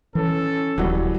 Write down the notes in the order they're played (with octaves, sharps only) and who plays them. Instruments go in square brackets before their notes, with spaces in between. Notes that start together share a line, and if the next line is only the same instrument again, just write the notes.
[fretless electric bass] E3 [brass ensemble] C#4 A4
[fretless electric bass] D#1 [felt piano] E3 F#3 G3